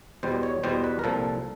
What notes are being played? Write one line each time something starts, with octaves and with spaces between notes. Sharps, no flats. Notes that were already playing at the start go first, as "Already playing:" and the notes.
E2 B2 G3 C5
C#5
E2 B2 G3 C5
B4
A#4
C2 A#2 F3 A4